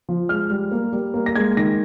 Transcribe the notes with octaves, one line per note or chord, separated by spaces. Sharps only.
F3
G#3 F6
G3
A#3
G3
A#3
A#6
G#3 G#6
D#3 A#6